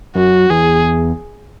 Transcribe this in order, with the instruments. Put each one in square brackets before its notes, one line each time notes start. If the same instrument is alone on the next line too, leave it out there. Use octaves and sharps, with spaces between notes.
[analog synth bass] F#2 [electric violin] F#4
[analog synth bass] E2 [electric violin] G#4